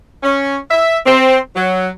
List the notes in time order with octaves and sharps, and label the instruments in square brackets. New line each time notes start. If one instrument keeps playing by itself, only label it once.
[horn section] C#4
E5
C4
F#3